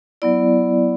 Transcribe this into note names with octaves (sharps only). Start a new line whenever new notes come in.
F#3 B3 E4 D5